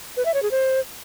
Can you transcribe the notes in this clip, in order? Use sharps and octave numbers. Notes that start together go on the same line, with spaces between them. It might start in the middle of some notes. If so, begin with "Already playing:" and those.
B4
E5
C#5
G#4
C5